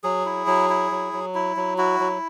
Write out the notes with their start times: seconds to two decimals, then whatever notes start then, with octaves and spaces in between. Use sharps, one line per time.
0.03 F#3 G#4
0.26 E4
0.47 F#3
0.70 E4
0.91 F#3
1.13 F#3
1.35 E4
1.56 F#3
1.78 E4 F#4
2.00 F#3